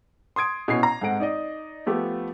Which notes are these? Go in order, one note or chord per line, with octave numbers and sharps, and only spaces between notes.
C6 D#6 G#6 D7
B2 C#4 E4 C7
A#5
G#2 C4 A4 F#5 D7
D#4 D5 D#5
F3 A3 B3 G4